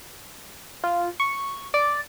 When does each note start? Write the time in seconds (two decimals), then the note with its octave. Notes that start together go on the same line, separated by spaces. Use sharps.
0.84 F4
1.20 C#6
1.74 D5